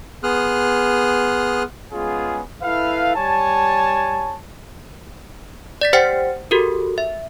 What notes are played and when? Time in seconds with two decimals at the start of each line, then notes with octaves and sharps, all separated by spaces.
0.23 B3 G#4 C6 D#6 F6 F#6
1.92 G#3 B3 C#4 F4 G#4
2.62 E4 A4 B4 F5
3.15 G3 C#5 G#5 A5
5.81 D5 A6 B6
5.93 G4 C5 F#5 G5 A6 C#7
6.51 F#4 G4 A4 A#4
6.98 E5